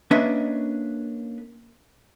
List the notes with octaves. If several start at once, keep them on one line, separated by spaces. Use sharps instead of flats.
A#3 C#4 D4 B4 D#5 E5